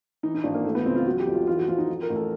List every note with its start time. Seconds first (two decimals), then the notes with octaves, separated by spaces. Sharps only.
0.23 E3 D#4
0.34 D#4
0.44 G#1 D4
0.54 A#3
0.65 E3 A3
0.75 B3
0.86 C#2 C4
0.95 F4
1.06 F#3 F#4
1.20 G4
1.27 F2
1.33 F4
1.47 E3 F4
1.57 F#4
1.68 F2 F4
1.78 D#4
1.88 F3
2.02 A#4
2.10 A1
2.16 A4